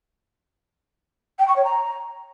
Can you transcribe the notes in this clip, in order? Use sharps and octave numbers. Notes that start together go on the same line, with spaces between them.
G5
C#6
C#5
A#5